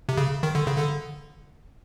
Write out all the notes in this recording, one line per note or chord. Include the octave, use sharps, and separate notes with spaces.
C3
C#3
D#3
D3
C#3
D3